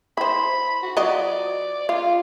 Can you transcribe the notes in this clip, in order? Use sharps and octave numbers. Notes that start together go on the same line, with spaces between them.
E4 C5 B5
F#4
F#3 F4 D5 D#5
F4 F5